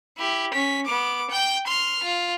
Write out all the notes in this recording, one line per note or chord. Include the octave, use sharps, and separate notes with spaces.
E4 G4
C#4 B6
B3 D6
G5 G6
C6 F6
F4